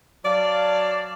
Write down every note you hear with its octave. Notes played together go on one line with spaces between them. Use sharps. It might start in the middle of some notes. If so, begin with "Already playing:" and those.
F#3 D5 F5 A5